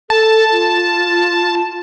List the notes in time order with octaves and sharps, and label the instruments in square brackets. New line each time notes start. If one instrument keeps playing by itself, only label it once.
[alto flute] A4 [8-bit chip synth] A5
[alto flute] F4